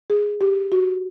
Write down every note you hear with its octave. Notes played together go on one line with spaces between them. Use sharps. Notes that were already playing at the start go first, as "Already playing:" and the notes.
G#4
G4
F#4